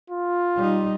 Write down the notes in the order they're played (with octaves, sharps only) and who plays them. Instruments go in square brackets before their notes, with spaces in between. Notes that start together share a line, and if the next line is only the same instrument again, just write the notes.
[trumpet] F4
[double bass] G3 D#4